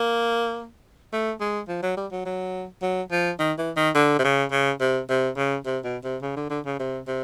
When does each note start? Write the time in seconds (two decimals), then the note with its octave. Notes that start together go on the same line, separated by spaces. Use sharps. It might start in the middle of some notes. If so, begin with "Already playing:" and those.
Already playing: A#3
1.13 A3
1.40 G#3
1.68 F3
1.83 F#3
1.97 G3
2.12 F#3
2.25 F#3
2.82 F#3
3.11 F3
3.39 D#3
3.58 E3
3.76 D#3
3.95 D3
4.19 C3
4.24 C#3
4.51 C#3
4.80 C3
5.09 C3
5.37 C#3
5.65 C3
5.84 B2
6.04 C3
6.22 C#3
6.36 D3
6.50 D3
6.65 C#3
6.79 C3
7.07 C3